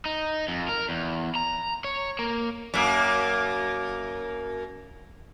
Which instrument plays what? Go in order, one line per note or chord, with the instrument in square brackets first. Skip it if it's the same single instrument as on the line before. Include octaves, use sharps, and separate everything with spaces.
[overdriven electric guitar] D#4
F2
A#4
E2
A#5
C#5
A#3
[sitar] F#2 A#3